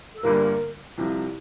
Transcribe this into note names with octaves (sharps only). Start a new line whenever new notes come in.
A4
G1 G2 D3 G3 A#3 A#4
C2 C3 F3